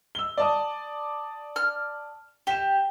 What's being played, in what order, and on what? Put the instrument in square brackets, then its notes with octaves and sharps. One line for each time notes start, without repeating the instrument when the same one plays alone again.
[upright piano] E6 G7
D5 A5 D#6
[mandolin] F6
[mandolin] G4 [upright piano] E7 G7